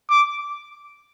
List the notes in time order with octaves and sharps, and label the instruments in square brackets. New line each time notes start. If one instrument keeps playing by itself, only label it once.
[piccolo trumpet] D6